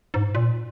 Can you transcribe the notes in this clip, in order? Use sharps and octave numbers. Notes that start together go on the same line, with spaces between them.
G#2
A#2